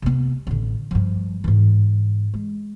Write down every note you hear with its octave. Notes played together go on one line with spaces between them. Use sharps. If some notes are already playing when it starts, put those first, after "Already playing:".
C3 B3
A1 D3
G2 F3
G#2 E3
G#3